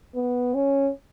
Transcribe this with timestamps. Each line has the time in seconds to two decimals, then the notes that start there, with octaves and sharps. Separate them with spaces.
0.15 B3
0.54 C#4